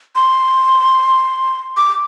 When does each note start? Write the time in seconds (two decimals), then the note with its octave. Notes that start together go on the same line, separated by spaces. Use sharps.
0.16 C6
1.77 D6